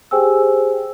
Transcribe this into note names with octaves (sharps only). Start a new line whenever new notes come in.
G4 G#4 C5 G5 G#5 E6